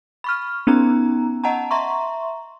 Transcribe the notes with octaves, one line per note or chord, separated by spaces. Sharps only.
B5 C#6 F6
B3 C#4 D#4 A#5
D#5 F#5 A5 A#5
E5 A#5 C6 C#6